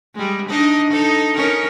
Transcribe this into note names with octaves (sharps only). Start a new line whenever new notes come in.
G3 G#3
D4 D#4 D#5
D#4 A4
C#4 D#4 A#4